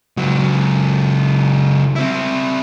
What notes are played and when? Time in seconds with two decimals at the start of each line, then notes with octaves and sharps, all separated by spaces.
0.17 C#2 F#3
1.95 C4 E4